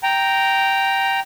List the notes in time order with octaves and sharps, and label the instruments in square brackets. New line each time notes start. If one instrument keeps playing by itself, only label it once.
[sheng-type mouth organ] G5 A#5